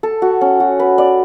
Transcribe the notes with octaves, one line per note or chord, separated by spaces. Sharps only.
A4
F#4
C#4
F#4
B4
D5